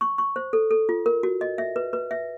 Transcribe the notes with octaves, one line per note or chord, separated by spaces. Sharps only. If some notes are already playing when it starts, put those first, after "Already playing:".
C#6
C#6
C5
A4
A4
F4
A#4
F#4
D#5
E5
B4
B4
E5